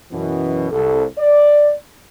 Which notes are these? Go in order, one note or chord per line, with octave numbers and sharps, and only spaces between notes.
F#2 B2 E3
C2 A4
D5